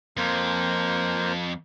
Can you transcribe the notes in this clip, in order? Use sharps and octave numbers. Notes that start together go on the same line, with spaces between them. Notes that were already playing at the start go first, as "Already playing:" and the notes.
F2 A#3 C5